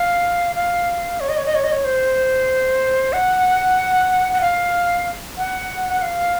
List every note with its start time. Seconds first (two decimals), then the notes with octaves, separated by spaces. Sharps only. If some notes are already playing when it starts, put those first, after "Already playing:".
Already playing: F5
0.55 F5
1.20 C#5
1.29 D#5
1.37 C#5
1.46 D#5
1.55 C#5
1.64 D#5
1.72 C#5
1.85 C5
3.13 F#5
4.33 F#5
4.41 F5
5.38 F#5
5.89 F#5
6.02 F5